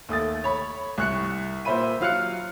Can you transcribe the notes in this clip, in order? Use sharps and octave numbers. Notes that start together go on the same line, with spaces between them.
D#2 A3 D#6 A6
C#5 B5
C2 C#6 F#6 C#7
A#2 C5 E5 B5 D#7
F#3 F4 F5 F6 F#6 C#7